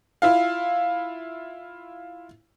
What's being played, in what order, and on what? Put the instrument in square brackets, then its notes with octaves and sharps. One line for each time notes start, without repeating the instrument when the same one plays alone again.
[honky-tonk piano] E4 F4 F5